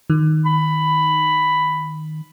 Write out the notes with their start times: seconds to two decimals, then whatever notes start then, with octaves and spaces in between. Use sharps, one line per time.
0.10 D#3
0.45 B5